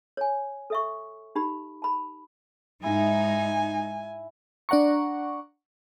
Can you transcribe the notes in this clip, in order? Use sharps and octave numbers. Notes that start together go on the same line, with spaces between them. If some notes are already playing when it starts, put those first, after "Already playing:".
C#5 G#5
A4 E5 C#6
D#4 G4 B5
A5 B5
G#2 G#3 D#4 E4 F5 G#5
D4 D5 F#5 A#5 C#6